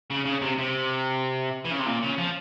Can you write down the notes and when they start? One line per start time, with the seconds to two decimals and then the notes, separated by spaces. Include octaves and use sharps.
0.10 C#3
0.25 C#3
0.41 C3
0.58 C3
1.65 E3
1.71 C#3
1.79 C3
1.86 A#2
2.03 C#3
2.18 F3